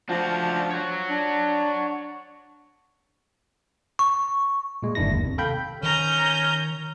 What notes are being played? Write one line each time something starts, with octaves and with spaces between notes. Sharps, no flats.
F3 D4 F#4
C#5 F#5
D4
C#6
A#2 G#3
G1 F#2 D#3 D4 E4 A#6
D#2
C3
A4 F5 G5 B5 G6
D#3 C#4 A#5 G6